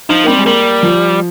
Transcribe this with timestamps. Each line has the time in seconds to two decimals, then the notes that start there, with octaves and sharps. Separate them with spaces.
0.09 F3 D#4
0.24 A#3
0.28 G3 C4
0.39 G#3
0.45 G3 A#3
0.83 F3